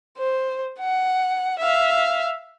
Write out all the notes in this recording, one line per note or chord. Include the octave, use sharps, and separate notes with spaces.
C5
F#5
E5 F5